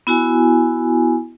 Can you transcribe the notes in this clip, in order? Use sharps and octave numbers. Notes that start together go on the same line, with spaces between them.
B3 E4 F#4 G#5